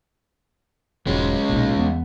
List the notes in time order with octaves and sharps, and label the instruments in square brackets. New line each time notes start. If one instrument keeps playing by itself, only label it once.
[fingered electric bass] E1 G#2 F#3 [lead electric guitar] G#3 C#4
[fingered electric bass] B1 A#2
E2 B3